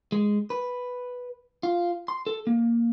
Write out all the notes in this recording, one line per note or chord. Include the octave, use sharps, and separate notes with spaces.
G#3
B4
F4
C6
A4
A#3